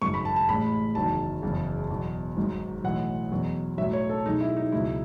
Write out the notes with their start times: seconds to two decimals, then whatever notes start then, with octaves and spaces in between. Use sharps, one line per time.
0.01 G#1 F#2 C#3 C#6
0.14 B5
0.25 A5
0.36 A5
0.48 A1 A2 G#3 B5
0.95 F#1 E2 D#3 F#3 A5
1.42 F#1 E2 C#3
1.90 E2 B2 F#3
2.37 G#1 G#2 F#3
2.84 B1 A2 E3 F#5
3.32 E2 B2 F#3
3.78 B1 A2 F#3 E5
3.93 C#5
4.09 A4
4.26 B1 B2 G#3 D#4
4.41 E4
4.57 D#4
4.72 C#2 B2 F#3 E4